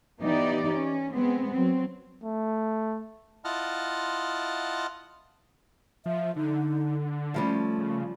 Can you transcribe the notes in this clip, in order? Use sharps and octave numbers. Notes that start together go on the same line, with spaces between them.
E3 B3 D#4 G4 D5
C#4
G#3 B3 C4
F#3 C4
A3
E4 F4 D#5 F#5 A5 F6
F3 E5
D3 D#4
F3 G3 A3 C#4
C#3